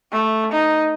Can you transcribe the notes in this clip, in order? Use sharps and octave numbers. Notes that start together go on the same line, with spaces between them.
A3
D#4